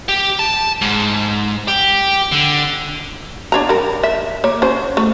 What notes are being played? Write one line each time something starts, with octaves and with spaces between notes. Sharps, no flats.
G4
A5
G#2
G4
D3
D4 C#5 A#5
G3 A#4
E5
A#3 C#5
C#4 C5
A3